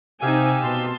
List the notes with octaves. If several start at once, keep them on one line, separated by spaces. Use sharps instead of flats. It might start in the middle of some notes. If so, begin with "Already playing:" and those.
C3 C4 D#4 G4 F5 G#5 E6
B2 B3 A5 C6